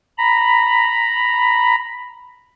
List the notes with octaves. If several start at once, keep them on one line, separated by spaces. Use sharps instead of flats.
A#5 B5